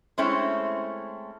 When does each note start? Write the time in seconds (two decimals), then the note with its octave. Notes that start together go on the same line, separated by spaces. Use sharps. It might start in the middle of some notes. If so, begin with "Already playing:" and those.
0.18 G#3 A3 C4 C#4 E4